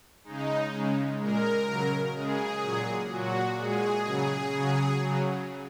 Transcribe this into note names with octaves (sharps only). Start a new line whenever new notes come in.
C#3 G#3 D#4
C#3 G#3
A#2 G#3 A#4
C#3 F#3
C#3 G#3 G#4
A#2 F#3
A#2 F#3 F#4
A#2 G#3 G#4
C#3 F#3
C#3 F#3
C#3 F#3